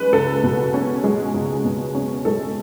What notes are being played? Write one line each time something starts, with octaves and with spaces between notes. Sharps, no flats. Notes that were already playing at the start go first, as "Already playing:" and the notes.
Already playing: G#3 C#4 B4
C#2 A4
B2
C#4
G#3
C#2
B2
C#4
G#3 A4